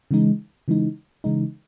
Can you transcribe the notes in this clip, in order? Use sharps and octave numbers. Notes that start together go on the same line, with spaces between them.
C#3 E3 G#3 D#4
C#3 E3 G#3 D#4
C#3 E3 G#3 D#4